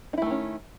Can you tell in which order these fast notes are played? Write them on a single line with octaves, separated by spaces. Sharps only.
D#4 E4 A3 D#3 C#4